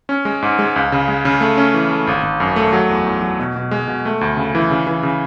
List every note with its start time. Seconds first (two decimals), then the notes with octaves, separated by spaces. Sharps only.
0.09 C#4
0.25 G#3
0.42 G#2
0.59 G#3
0.76 C#2
0.92 C#3
1.08 G#3
1.25 C#3
1.41 A3
1.57 C#4
1.74 E3
1.90 A3
2.07 G#1
2.23 G#1
2.40 F#2
2.56 A3
2.73 F#3
2.90 E2
3.06 E2
3.22 F#3
3.39 B2
3.56 B2
3.71 G#3
3.88 B2
4.05 A3
4.21 D2
4.37 C#3
4.55 E3
4.70 C#3
4.87 E3
5.03 C#3